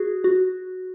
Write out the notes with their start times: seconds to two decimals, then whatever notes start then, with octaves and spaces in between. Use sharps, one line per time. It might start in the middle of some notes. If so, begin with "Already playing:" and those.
Already playing: F#4 G#4
0.24 F#4